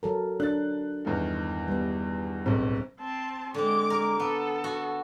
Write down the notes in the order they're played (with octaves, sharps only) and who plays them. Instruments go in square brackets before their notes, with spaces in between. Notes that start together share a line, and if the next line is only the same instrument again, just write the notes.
[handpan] F#3 A4 A#4
[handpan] D4 [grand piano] F#6 A6
[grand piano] E2 G2 D#3
[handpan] G3 B3
[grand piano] D1 B1 [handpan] C4
[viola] C4 A5
[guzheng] D3 C4 [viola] G#3 D6
[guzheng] A#4
[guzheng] B3 [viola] A4
[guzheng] F#4